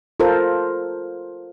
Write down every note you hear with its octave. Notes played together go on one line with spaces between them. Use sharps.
F4 A4 A#4 C5